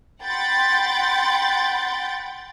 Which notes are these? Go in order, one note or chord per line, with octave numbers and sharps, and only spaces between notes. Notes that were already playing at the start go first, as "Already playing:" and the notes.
F#5 G5 B5 C6 G6 A6